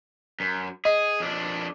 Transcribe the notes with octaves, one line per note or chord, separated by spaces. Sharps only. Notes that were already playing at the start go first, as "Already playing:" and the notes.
F#2
G#4 D#5
F2 D4